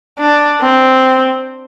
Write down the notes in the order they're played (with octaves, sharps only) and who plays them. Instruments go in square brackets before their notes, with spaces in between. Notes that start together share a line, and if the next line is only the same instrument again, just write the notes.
[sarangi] D4
C4